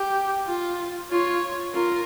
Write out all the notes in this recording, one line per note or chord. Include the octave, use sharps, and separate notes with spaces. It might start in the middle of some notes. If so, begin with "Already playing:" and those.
Already playing: G4
F4
F4 C#5
F4 A#4